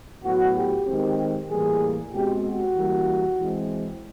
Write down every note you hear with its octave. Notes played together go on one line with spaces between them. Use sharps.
A2 F#3 B3 F#4
G4
D#3 G#3 C4
A2 E3 G3 A#3 G#4
B2 G#3 C4 G4
F#4
E3 G3 A#3
E3 G#3 C4